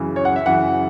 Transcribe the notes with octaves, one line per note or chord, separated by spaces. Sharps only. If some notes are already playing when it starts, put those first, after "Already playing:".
Already playing: F#2 C#3 E3
C#5
F#5
E5
F#2 C#3 E3 F#5